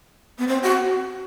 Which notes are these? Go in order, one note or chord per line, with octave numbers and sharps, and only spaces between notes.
B3
C4
F#4